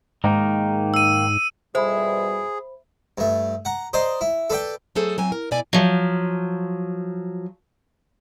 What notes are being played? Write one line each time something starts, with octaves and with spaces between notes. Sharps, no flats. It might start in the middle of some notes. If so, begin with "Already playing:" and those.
G#2 D#3 A#3 D#4
E6 D#7
F2 B2 G3 E4 G#4 C5 B5
G2 A3
F#5 A#5
C5 D5 D#5 A#5 C6
E4
A4 B4 D5 G5
F#3 A3 G#4 A4 C5
A2 F#3 C4 G#5
A#4
B2 E4 D5 G#5
F3 F#3